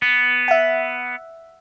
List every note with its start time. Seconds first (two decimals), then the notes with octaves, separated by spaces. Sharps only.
0.02 B3
0.48 E5 F#5